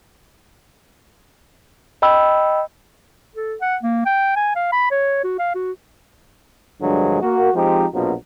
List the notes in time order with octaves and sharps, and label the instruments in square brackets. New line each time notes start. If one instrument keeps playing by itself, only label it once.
[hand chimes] D#5 G5 B5 E6
[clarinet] A4
F#5
A#3
G5
G#5
F5
B5
C#5
F#4
F5
F#4
[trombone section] G2 D3 F3 F#3 G#3
A#3 F#4
F3 G#3 C4 D#4 G4
A#1 F2 B2 F3 F#3